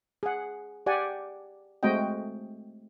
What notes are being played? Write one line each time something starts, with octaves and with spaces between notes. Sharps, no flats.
G#4 F#5
G4 D5 F#5 G#5
G#3 A3 C4 F#4 D#5 G5